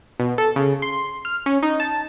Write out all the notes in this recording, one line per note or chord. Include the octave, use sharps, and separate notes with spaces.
B2
A4
C#3
C6
F6
C#4
D#4
A5